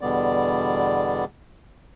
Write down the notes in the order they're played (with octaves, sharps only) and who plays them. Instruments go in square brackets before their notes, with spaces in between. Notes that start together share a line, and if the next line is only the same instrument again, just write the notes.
[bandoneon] E2 B2 D3 G3 B3 D5